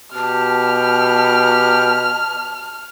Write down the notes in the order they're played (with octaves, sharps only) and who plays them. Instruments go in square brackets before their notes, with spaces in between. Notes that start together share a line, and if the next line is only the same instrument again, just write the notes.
[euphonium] B2 [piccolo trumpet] G4 [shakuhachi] A5 [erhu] F6